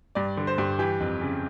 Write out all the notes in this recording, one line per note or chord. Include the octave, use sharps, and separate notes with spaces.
G2 D5
D3
C5
G2
E3 G4
F2
C#3